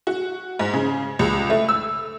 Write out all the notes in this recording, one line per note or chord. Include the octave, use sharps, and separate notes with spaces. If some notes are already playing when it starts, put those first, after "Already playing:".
F#4
G#2
C#3
C#2
A3
E6